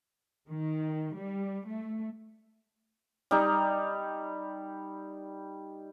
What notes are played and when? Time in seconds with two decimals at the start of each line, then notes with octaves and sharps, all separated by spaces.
0.50 D#3
1.16 G3
1.67 A3
3.31 G3 D#4